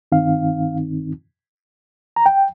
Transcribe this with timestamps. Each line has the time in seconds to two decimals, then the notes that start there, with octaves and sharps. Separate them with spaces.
0.12 G2 D#3 C4 D#4 F5
2.16 A#5
2.26 G5